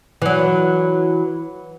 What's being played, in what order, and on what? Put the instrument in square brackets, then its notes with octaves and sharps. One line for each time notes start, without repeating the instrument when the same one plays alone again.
[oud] E3 F#3